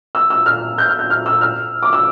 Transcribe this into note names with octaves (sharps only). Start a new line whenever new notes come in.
E6
E6
F6
G6
F6
G6
F6
E6
F6
D6
E6